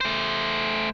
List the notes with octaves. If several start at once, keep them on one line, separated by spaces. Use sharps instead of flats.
A3 C5